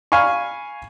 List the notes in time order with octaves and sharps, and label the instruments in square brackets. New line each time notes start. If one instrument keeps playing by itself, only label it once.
[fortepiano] F5 G#5 B5 C#6